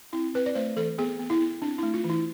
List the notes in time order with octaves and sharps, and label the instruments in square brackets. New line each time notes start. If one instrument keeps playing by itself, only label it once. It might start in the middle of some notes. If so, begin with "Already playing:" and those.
[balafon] C4 E4
C4 B4
D5
A3 C5
E3 A4
B3 G#4
B3
E4
B3
C4 D4
E4
A3
F4
E3
E4